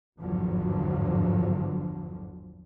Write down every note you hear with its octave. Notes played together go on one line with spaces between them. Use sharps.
G#1 E2 G2 D3 F3 F#3